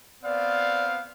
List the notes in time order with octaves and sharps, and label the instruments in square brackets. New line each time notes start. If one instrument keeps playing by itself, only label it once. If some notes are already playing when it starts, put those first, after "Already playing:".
[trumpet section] B3 C4 F5 [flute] D5